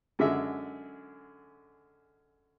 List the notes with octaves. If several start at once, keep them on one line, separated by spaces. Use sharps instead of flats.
F#2 D3 G#3 E5